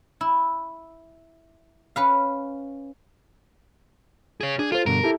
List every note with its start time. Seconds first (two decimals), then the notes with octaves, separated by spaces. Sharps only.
0.21 E4
1.96 C#4 B4 F5
4.41 G#4 C#5
4.59 D4 G#4
4.72 F4 A4 C5
4.86 G2 B2 D3 A#4
5.04 E4 G4 A4